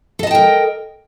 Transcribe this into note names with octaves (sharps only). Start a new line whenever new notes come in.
A4 A#4 D#5 G5 A5